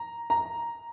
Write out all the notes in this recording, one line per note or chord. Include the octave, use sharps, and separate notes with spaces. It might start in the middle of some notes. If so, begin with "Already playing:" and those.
Already playing: A#5
A#5